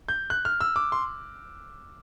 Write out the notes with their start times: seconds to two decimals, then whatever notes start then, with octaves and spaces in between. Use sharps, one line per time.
0.08 G6
0.30 F#6
0.45 F6
0.61 E6
0.76 D6
0.92 C6